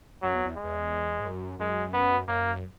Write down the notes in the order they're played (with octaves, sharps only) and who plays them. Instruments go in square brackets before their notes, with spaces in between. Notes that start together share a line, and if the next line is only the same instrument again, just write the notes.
[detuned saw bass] F#2 [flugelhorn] F#3
[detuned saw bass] E2
E2
[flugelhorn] G#3
[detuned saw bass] E2
G#2
F#2
[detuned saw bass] F#2 [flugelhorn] G#3
[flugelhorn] B3
[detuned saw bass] F#2 [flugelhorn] A#3